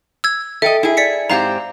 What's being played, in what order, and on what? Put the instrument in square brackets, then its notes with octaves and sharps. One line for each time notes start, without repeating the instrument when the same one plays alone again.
[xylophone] E6 G#6
[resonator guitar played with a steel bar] A4 D#5 [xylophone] E5 G5
[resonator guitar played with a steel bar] E4 G#4
[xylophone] D5 B6 C#7
[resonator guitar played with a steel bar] G#2 C4 G4 [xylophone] F5 A#5